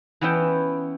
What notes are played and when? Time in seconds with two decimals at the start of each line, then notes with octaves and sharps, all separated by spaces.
0.21 E3 B3 C#4 E4 G5